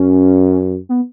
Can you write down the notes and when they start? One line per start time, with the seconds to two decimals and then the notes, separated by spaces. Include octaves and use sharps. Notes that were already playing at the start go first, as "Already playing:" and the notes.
Already playing: F#2 C#4
0.89 B3